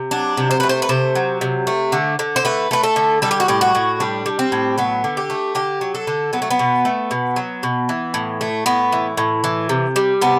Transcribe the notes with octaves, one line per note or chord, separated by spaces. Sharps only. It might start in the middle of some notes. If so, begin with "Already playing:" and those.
Already playing: C3
F#3 D4
C3
C5
A3 B4
C5
B4
C3 C5
F#3
C3
A3
D3
D3
C5
A3 B4
A3 B4
A4
D3
G3 A4
G4
F#4
A2 G4
F#4
A2
G3 D4
G3
C4
A2
F#3 B3
D3
G4
A3
D3 G4
F#3
A4
D3
F#3 B3
A3
B3
B2
A3
B2
F#3
B2
E3
A2
A3
A2 B3
E3
A2
E3
C3
G3
C3 B3